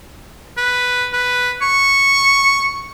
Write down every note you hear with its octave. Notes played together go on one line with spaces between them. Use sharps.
B4
B4
C#6